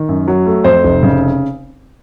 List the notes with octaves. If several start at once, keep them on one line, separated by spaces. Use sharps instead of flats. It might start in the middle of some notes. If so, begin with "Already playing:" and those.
Already playing: D#3
F#2
F#3
A3
F2 C5
F1
C#3